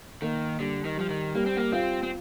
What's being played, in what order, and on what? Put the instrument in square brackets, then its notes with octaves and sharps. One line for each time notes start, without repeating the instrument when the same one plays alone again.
[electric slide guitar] D#3 [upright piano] A#3
[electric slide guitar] D3 [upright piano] G3
[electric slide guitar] D#3
[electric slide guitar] F3 [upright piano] G3
[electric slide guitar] D#3
[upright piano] G3 [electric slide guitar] A#3
[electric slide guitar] C4
A#3
[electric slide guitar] C4 [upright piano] F4
[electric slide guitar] C4